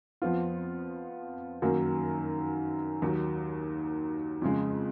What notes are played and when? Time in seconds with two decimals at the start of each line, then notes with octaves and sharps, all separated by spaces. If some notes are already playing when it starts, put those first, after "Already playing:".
0.22 F2 F3 B3 F4
1.62 F#2 D#3 F#3 A#3
3.02 D#2 D#3 F#3
4.42 F2 C#3 G#3